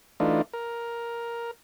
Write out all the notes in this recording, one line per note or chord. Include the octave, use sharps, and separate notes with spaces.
E3 A3 D4 D#4 F4
A#4